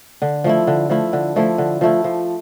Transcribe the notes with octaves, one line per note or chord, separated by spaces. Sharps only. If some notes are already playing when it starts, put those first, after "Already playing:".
D3
F3 A3 E4
D3
F3 A3 E4
D3
F3 A3 E4
D3
F3 A3 E4
F3